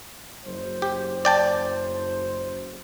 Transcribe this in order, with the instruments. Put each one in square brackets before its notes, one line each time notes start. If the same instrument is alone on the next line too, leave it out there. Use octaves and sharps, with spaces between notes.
[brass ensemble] F#1 F#2 C5
[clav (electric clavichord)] G4
D5 G5 A5